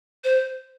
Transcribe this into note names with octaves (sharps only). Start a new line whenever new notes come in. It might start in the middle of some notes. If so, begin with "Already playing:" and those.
C5